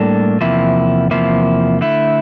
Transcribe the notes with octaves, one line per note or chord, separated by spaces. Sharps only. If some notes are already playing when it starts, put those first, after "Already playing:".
Already playing: A2 G3 A#3 D4 A4
E2 C3 F3 A#3 E4
E2 C3 F3 A#3 E4
D3 A3 E4